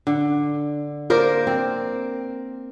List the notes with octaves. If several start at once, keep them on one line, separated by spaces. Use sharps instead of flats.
D3
A#3 A#4 C5 D5
C4